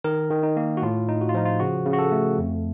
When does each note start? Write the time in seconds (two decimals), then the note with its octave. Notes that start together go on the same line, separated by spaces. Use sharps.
0.04 D#3 A#4
0.30 D#3
0.43 D#4
0.57 A#3
0.77 F#4
0.82 A2 F4
1.09 D#4
1.21 F#4
1.29 F4
1.34 F3 D#4
1.45 F4
1.60 C#3 F#4
1.85 C#3
1.93 F#4
1.99 A4
2.12 A3
2.38 F2